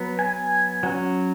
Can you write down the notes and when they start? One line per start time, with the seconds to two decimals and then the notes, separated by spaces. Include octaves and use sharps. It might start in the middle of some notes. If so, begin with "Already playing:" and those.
Already playing: F#3 B3
0.19 G#5
0.83 F#3 C#4